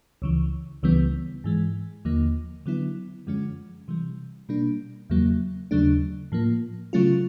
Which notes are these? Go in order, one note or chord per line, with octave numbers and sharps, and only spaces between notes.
C#2 C#3 E3
C#2 C#3 E3 G3 B3
G#2 E3 G#3
D#2 D3 F3 A#3
D3 F#3 B3 E4
F#2 D3 F3 G#3 C#4
C3 E3 G3
B2 G3 A#3 D4
E2 C#3 F#3 A#3
D#2 C#3 F#3 A3 D4
A2 F3 A#3
C#3 F#3 A3 C#4 F4